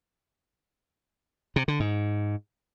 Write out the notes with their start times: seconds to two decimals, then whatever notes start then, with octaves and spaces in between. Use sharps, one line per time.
1.56 C3
1.68 D3
1.80 G#2